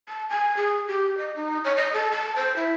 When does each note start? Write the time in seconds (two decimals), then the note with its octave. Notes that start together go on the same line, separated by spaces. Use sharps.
0.09 A5
0.30 G#5
0.57 G#4
0.88 G4
1.18 D#5
1.36 D#4
1.64 C#5
1.77 D#5
1.94 A4
2.12 A5
2.36 C5
2.56 E4